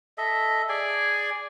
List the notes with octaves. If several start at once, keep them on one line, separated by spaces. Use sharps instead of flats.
A4 D#5 E5
G#4 D5 G#5